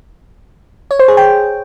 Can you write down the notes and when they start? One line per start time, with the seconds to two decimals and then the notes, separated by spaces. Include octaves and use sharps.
0.91 C#5
0.99 C5
1.08 G#4
1.17 G5